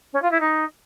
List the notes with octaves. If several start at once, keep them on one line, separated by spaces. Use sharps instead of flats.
C#4
F4
E4
D#4